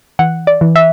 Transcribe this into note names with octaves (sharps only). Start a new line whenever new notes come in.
E3 F#5
D5
E3
E5